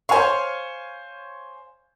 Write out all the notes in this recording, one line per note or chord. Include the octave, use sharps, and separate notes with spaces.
C5 C#5 F5 G#5 C#6